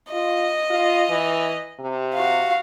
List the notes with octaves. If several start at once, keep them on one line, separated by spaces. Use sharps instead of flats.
F4 D#5
F4
E3
C3
F#4 F5